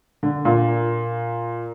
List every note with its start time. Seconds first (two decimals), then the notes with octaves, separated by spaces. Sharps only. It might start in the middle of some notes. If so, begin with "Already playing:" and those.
0.23 D3
0.45 A#2